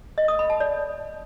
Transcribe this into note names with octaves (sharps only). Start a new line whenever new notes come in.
D#5
D#6
B5
A5
D5